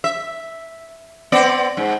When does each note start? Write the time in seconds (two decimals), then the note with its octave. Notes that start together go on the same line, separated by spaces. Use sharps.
0.04 E5
1.32 B3 C4 D5
1.77 G#2